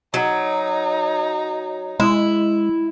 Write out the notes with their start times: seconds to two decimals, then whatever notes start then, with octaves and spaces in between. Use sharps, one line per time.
0.14 F#3 D#4
2.00 G#3 E4